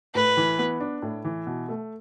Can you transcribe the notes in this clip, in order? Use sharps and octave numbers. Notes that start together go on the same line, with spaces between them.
A2 B4
E3
B3
D4
A2
E3
B2
A3